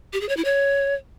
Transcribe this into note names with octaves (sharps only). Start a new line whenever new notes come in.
G4
G#4
C#5
E4
C#5